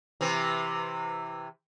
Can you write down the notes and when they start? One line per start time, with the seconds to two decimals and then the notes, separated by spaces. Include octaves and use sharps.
0.21 C3 E3